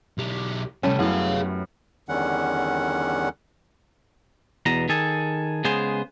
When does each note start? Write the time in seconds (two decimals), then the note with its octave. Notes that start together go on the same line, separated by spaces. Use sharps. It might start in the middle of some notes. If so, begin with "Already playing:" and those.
0.18 B1 G4
0.83 A2 C3 G3 A3 C#4
0.99 F#2 B3 E4 G#4 F5
2.09 E2 D3 D#3 G3 C#4 F#5
4.66 E2 B2 A#5
4.89 D#3 G#4 A4
5.65 C#3 G#3 B3 G#4 C5